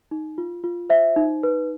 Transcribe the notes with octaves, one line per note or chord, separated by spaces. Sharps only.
D#4
F4
F4
C5 E5
D#4
B4